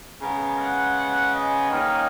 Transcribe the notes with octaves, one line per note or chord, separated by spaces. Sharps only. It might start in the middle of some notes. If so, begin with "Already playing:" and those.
C#3 G#3 B3 A#4
F#5
D#5
D#3 A#3 C#4